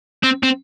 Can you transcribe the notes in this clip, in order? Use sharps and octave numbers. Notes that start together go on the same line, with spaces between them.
C4
C4